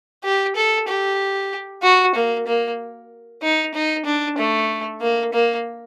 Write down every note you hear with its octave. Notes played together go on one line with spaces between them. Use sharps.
G4
A4
G4
F#4
A#3
A#3
D#4
D#4
D4
A3
A#3
A#3